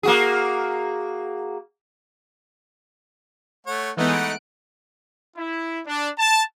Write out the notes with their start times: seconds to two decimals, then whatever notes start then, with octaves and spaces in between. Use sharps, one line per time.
0.03 A#3 F#4 G#4
3.67 A3 C#5 F#5
3.97 E3 G#3 A3 B3 D#4 F#5
4.13 F#6 D7
5.37 E4
5.87 D4
6.19 A5